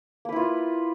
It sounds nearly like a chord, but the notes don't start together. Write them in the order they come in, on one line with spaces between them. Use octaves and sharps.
A#3 B4 E4 F4